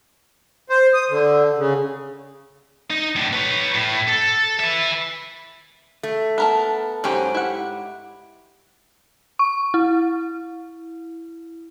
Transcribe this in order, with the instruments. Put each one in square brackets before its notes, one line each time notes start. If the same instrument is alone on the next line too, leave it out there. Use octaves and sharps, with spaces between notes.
[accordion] C5
D#6
D3
C#3
[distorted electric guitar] D#4
A2 D3
B4 C#5
A2
A4
B4 E5
[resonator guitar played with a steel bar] A3
[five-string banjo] B3 A#4 A5
[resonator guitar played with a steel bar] G#2 G4 [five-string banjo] F#3 C#4 C5
[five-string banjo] E4 F#5
[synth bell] C#6
E4